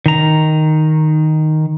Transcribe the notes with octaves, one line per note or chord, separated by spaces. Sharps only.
D#3 A#5